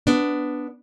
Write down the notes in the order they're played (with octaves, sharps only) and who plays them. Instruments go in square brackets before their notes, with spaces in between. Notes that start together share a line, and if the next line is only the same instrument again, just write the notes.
[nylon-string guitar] B3 D4